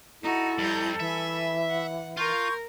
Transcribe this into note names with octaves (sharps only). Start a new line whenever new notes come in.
D#4 E4 F#4 A4
F2 G3 A#5 G6
E3 E5 G#5 B5
F#5
F4 A#4 C6 C#6 G6